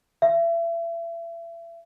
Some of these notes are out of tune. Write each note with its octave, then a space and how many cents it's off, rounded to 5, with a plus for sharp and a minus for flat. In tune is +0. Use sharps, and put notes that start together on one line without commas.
E5 +35